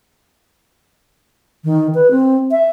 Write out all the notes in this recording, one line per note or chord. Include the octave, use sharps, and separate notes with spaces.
D#3
B4
C4
E5